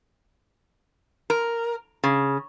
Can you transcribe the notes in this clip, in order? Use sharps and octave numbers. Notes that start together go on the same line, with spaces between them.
A#4
C#3